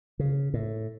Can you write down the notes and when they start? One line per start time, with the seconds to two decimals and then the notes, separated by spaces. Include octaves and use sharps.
0.19 C#3
0.54 A2